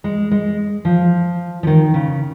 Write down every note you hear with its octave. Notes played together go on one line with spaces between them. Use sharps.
G#3
G#3
F3
F3
D#3
C#3